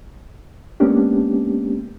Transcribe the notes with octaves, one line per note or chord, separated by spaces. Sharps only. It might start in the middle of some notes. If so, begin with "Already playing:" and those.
G#3 A#3 B3 C#4 D4 G4